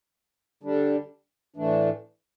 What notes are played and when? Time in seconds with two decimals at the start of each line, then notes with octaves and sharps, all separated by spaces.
0.63 D3 G3 D4
1.56 A2 E3 A3 D4